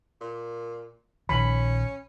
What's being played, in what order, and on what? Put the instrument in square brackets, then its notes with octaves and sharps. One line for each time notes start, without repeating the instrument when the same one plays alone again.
[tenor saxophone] A#2
[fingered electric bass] A#1 D#3 F3 [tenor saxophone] C#4 [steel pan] B5